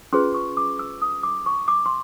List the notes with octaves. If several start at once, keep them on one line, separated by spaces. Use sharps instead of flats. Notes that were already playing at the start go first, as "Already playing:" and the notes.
C#4 F4 G#4 B4 C6
C#6
D6
E6
D#6
D6
C#6
D6
C6